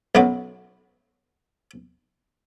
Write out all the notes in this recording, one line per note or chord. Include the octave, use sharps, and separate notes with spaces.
B1 F#2 B2 F#3 B3